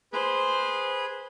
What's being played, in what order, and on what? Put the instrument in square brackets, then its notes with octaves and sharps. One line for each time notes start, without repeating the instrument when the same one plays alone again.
[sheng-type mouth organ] G#4 B4 [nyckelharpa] C5